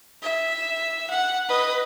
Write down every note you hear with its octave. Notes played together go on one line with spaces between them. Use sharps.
E5
F#5
B4 D#5